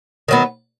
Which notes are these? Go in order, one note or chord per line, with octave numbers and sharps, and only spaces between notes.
D#3 F#3 B3